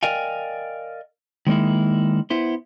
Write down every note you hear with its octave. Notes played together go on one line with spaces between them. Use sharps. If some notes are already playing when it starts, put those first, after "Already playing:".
A#4 D5 D#5 F5 G5 G#5
D#3 G#3 A#3 D#4 E4
B3 E4 C5